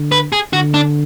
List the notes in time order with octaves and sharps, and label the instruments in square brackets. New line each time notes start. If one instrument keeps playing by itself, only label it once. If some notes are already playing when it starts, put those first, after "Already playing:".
Already playing: [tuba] D3
[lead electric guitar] B4
G#4
[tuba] D3 [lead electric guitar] F#4
[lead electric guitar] D4